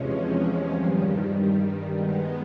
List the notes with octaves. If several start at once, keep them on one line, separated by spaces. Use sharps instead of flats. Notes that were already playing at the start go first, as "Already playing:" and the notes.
Already playing: E2 C3 F3 G#3 C#4
G2 D#3 G3
D#3 G#3 B3